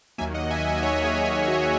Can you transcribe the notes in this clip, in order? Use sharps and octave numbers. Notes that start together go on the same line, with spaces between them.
D#2 D#3 F#3 A#3 E5 G#5
D#5 F#5
E5 G#5
D#5 F#5
C#5 E5
G#4
G#4
F#4